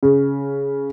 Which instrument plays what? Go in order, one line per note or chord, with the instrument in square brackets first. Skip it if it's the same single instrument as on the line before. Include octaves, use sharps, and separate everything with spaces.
[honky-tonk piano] C#3